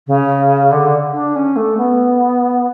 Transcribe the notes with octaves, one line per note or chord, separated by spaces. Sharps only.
C#3
D3
D4
C#4
A3
B3